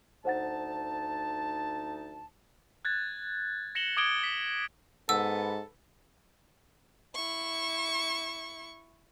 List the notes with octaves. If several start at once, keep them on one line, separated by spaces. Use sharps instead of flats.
D2 D#4 C5 F#5 A5 A6
F#6 G#6 A6
A#6 C#7 E7 F#7 G7
D6 D#6 G#6 D7 G7
B6
G#2 B3 A4 E6
E4 C#6